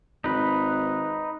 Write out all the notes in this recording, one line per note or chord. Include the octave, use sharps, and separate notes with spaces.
G#1 D#4 B4